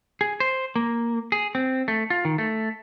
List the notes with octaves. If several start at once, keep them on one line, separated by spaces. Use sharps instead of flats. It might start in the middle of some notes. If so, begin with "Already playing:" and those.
G#4
C5
A#3
G#4
C4
A3
F4
D#3
A3